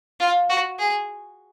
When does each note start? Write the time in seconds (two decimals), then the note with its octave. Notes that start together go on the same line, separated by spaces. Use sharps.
0.20 F4
0.49 F#4
0.79 G#4